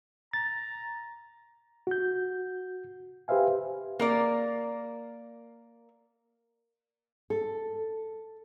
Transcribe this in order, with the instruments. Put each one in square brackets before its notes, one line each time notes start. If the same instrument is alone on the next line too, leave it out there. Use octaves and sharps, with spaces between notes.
[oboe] A#5 [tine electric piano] A6
[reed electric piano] F#4 G6
G4 B4 C5 E5 F5 G#5
[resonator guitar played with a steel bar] A#3 A#4 D5
[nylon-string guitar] A4